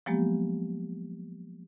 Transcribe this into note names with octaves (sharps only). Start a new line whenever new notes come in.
F3 F#3 G#3 A#3 B3 G4